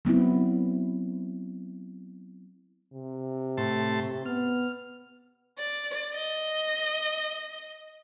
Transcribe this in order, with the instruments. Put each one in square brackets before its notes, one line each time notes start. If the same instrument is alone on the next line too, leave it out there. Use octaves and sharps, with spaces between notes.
[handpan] F#3 B3 C4 E4
[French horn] C3
[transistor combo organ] A2 A5 C6
[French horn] B3 [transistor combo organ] F6
[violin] D5
D#5